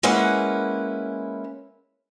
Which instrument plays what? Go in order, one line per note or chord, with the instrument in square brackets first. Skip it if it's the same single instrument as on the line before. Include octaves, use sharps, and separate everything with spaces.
[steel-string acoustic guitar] G#3 A#3 C#4 E4 B4 F#5